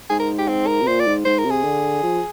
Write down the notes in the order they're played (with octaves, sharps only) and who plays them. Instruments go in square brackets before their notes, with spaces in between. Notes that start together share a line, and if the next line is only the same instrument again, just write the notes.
[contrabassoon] G#2 [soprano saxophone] G#4
[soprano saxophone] A#4
G4
C4
A#4
[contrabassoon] C3
[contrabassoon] A#2 [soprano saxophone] C5
[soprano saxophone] D5
[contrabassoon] G#2
[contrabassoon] G#2 [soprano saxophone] C5
[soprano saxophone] A#4
[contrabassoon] C3
[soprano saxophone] G#4
[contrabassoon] D3
F3